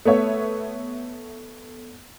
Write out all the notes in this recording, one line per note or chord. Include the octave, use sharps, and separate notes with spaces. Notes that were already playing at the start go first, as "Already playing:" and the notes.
A3 B3 C#5 E5